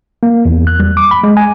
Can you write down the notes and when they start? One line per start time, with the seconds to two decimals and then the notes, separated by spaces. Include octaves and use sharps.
0.23 A#3
0.45 E2
0.67 F#6
0.80 G3
0.97 D6
1.11 B5
1.24 G#3
1.37 G#5